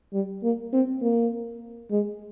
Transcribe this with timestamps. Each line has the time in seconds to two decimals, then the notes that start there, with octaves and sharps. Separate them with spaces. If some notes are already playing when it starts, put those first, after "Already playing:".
0.13 G3
0.43 A#3
0.73 C4
1.02 A#3
1.91 G#3